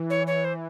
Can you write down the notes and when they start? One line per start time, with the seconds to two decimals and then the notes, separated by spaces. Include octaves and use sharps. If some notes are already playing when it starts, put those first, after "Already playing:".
Already playing: E3
0.10 C#5
0.27 C#5
0.45 C5